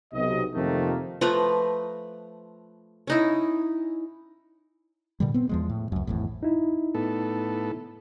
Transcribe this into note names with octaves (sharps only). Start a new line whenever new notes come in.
B1 C3 D#5
F2 C3 D#3 F3 A3 A#3
F3 A3 B4 A#5
C#4 D#4 E4
A#2 D3 G3
B3 C4
E2 F3 G#3
A2
C#2 F#2
G#1 E2 A2
D#4 E4
A2 B3 A4